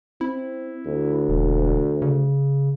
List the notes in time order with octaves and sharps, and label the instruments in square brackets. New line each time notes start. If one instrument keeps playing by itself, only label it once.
[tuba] C4 [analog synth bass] E4
[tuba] D2
[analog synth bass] E1
C#3